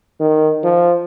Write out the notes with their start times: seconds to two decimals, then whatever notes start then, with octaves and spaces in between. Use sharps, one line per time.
0.20 D#3
0.64 F3